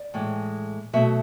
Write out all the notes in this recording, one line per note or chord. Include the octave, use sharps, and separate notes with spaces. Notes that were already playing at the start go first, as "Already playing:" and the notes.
Already playing: D5
A2 E3 G#3
B2 F#3 A3 E5